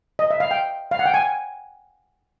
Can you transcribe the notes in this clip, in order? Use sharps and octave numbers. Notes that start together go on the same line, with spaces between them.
D#5
E5
F5
G5
F5
F#5
G5
G#5